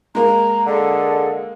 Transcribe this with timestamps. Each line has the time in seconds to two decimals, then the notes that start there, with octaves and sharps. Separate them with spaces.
0.15 G#3 A#3 A#5
0.66 D3 G#4 A4 D#5